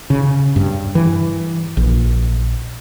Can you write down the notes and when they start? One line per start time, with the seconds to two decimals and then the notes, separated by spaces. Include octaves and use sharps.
0.10 C#3
0.56 G2
0.95 E3
1.77 A#1